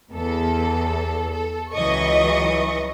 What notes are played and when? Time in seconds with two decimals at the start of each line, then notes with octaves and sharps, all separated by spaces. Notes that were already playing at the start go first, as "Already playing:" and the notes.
0.13 E2 A4
1.31 A4
1.73 C#2 E3 F#3 D#5 C#6